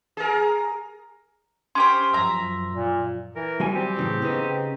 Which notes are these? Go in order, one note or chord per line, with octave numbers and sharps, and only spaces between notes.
G#4 A#4
C#4 G4 C5 C6
F#2 F3 E5 A#5
A#2
E3 A#4
C3 F#3 G3 G#5
C4 G4
A2 C#3 E3
C#3 B3 D#4